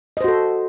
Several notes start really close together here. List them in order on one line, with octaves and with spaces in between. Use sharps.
D#5 C5 F#4 A4